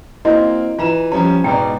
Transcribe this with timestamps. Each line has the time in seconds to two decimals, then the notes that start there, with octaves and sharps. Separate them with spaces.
0.25 A#3 C4 E4 F#4 D#5
0.79 E3 F4 A#5 E7
1.12 F3 G3 C#4 A#5
1.44 G#2 B2 D5 G5 A#5